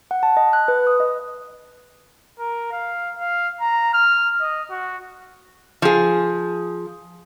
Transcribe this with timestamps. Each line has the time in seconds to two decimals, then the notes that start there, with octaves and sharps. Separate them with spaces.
0.11 F#5
0.23 A5
0.37 D#5
0.53 F#6
0.68 B4
0.87 D#6
1.00 D#5
2.39 A#4
2.72 F5
3.19 F5
3.61 A#5
3.94 F6
4.41 D#5
4.71 F#4
5.82 F3 G#4